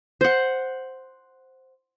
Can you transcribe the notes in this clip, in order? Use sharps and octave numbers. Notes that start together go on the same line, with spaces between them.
C5 F#5